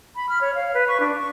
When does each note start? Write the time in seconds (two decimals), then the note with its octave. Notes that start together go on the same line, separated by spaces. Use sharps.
0.16 B5
0.29 F6
0.41 C#5
0.55 F5
0.74 B4
0.88 C#6
1.00 D4
1.18 C#6